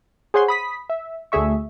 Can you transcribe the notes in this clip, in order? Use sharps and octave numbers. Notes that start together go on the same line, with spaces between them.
G#4 C5 C#5 F#5 G#5 C6
B5 D#6 B6
E5
D2 A3 G#4 E5 C#6